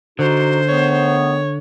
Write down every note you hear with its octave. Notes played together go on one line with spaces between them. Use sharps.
D3 D#4 F#4 C5
D#3 A3 B3 C#5